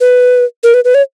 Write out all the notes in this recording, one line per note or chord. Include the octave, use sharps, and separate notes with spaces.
B4
A#4
B4
B4
C#5